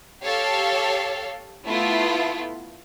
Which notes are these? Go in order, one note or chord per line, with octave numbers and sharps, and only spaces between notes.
G4 A4 C#5 F5
A3 B3 E4 F4